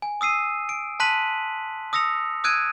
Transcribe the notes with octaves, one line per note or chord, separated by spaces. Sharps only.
G#5
D#6 E6 C7 D#7
D7
A5 C6 F#6 B6 D#7 F#7
D#6 E6 A#6 C#7 F7
D#6 E6 F#6 G#6 D7 D#7